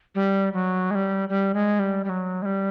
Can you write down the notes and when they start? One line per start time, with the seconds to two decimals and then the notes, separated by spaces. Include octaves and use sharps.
0.15 G3
0.53 F#3
0.91 G#3
0.95 G3
1.29 G3
1.54 G#3
1.79 G3
2.04 G3
2.09 F#3
2.42 G#3
2.45 G3